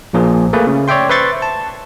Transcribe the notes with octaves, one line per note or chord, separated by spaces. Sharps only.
A#1 A#2 F3 G#4
A3 A#3 G#4 B4
C#3
C#5 D5 E5 G5 C6
B4 C5 E5 C6 C#6 A6
A5